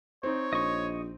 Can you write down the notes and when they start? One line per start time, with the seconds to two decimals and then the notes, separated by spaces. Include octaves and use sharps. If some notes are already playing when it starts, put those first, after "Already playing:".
0.23 C4 D#4 C#5
0.53 A#1 D#5 C#6